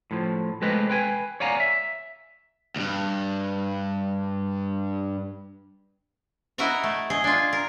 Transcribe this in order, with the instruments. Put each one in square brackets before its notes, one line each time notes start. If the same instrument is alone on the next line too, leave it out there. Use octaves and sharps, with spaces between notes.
[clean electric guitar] A2 F3
G#3 A3 C4 G4 B4 D#5
B4 G5 G#5
C#5 D5 F5 F#5 G#5 A#5
E5
[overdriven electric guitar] D2 G2
[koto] E4 F#4 A#4 D#5 A#5
A3
G#4 D#5
D4 F4
A#4